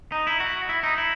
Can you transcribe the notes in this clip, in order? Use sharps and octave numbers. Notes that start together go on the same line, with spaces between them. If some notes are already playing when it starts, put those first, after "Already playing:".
D#4
E4
F#4
E4
D#4
E4